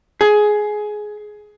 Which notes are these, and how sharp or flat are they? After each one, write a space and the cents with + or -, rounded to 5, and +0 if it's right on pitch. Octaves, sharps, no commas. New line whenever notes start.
G#4 +15